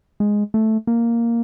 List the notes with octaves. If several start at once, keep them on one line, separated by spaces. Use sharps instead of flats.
G#3
A3
A#3